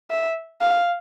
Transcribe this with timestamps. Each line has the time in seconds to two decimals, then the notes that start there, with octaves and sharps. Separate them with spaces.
0.11 E5
0.61 F5